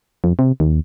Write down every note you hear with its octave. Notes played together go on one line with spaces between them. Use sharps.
F2
C3
D#2